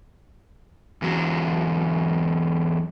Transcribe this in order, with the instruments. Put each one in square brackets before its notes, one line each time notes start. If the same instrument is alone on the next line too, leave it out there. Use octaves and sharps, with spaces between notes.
[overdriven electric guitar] E2 F#3